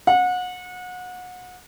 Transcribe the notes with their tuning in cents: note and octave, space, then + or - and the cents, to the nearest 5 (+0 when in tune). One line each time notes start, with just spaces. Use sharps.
F#5 -30